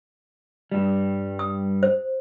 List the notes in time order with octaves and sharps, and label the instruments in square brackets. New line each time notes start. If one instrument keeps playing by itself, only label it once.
[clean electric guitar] G2 G3
[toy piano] D#6
C5